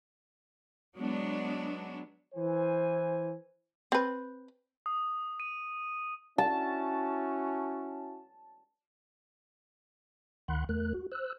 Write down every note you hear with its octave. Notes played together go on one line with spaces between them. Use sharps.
F#3 G#3 B3 D4
E3 C5 G#5
C4 B4
D#6
D#7
C#4 E4 F#4 A5
D2 D#3 F#5 B5 C6 F#6
E2 A3 A#4 F#6
F#4
C5 E6 F#6